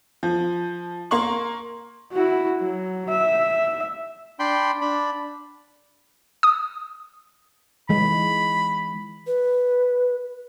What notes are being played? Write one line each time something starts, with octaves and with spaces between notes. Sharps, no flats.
F3
A#3 C6 C#6 F#7
E4 F#4
F#3
E5
D4 G5 B5 C6
D4 B5
D#6
E3 G#3 B5
B4